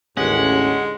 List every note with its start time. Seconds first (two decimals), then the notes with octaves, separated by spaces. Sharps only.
0.17 A1 D#2 D3 G#3 C#4 F#5